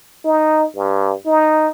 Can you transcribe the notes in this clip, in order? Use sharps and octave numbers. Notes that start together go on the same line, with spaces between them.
D#4
G2
D#4